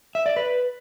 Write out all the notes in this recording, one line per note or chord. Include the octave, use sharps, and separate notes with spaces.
E5
D5
B4